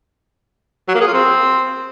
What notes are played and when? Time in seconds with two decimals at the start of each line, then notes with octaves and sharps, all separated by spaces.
0.88 F#3
0.95 A#3
1.01 G#4
1.07 F4
1.13 C4